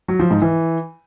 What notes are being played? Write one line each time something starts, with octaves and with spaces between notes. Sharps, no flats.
F#3
F3
G#2
E3